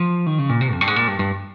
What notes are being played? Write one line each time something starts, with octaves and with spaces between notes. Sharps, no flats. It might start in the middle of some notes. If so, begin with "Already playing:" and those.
Already playing: F3
D#3
C#3
A#2
C3
F2
G2
G#2
A#2
G2
G2